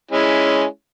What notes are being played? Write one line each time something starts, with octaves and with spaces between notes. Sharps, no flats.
G#3 C#4 E4